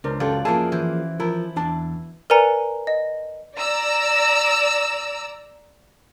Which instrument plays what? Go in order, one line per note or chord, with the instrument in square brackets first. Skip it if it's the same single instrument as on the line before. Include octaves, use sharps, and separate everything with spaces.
[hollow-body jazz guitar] C#2 [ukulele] D4 A#4 C5
[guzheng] F#2 F4 D5 [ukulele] G4 A4
[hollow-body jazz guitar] F3 A#3 G#4 [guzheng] E4 [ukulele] A5
[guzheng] E3 [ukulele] C5
[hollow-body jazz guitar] F3 A#4 [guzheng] E4
[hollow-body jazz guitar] E2 D4 A5
[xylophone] A#4 B4 D5 G#5 A#5 C#7
D#5
[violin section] D5 A#5 E6